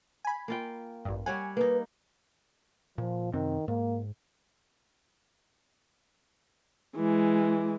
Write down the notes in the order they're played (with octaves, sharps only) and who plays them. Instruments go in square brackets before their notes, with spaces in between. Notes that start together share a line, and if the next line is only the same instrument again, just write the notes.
[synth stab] G#5 B5
[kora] A#3 F4 G5
[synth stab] A1 G2
[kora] G3 C#5 F#5 [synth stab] G#5
[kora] A#3 D#4 [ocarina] B4
[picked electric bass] A#2 [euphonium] F3
[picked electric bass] F#2 C3 C4 [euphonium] D#3
[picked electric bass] G#2 [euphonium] A#3
[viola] E3 G#3